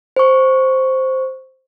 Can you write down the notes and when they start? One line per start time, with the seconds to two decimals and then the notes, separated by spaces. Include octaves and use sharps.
0.16 C5 C#6